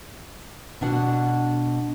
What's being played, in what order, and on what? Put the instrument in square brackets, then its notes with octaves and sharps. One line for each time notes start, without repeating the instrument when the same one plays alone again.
[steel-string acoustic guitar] B2 D4 F#5